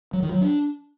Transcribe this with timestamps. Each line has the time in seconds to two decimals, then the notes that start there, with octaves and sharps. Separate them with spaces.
0.13 F#3
0.23 D#3
0.32 F#3
0.41 D4